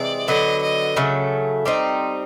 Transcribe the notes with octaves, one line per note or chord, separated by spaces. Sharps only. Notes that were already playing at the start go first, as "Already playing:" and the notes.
Already playing: C3 E3 G#3 D5
D3 F#3 B3 D#5
D#5
C#3 F#3 A3
G3 C4 D#4